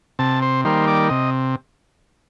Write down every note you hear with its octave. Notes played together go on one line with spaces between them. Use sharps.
C3 A5
C5
D#3 G3 A#3 C5
D5
C3 D#5